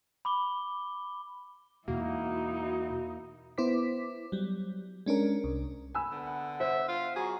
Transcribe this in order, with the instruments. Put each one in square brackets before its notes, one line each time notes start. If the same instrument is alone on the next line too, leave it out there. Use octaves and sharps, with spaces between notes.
[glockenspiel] B5 D6 G7
[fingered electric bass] E2 B2 G#3 [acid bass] A#3 [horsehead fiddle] D#4 E4 [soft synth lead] F#4
[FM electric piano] B3 E4 C5 D6 B6
F#3 G3
G#3 C#4 D4 A#4
C2
[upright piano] G#5 B5 E6
[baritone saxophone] D3 [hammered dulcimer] B3
[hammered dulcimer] F#5
[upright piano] C5 [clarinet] E5 [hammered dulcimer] F#5
[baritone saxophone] F4 [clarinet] F5
[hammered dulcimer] F#3 C6 [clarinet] F#4 [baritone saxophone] G#4